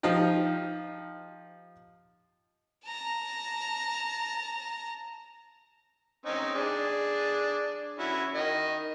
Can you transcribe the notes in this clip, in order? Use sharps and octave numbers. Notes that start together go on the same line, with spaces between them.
F3 D#4 F4 G4
A5 A#5
C4 C#4 D#4
D4 G#4
C#4 E4 F#4
D#3 D#5